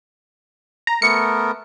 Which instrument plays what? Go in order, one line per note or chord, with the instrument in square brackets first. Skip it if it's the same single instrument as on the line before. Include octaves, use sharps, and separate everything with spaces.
[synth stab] A#5
[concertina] A3 B3 A#4 [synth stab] C#7